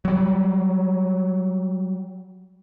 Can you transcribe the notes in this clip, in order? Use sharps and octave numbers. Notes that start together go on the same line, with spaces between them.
F#3 G3